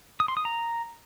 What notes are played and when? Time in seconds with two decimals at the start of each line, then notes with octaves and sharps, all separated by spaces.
0.20 D#6
0.28 C6
0.37 D#6
0.45 A#5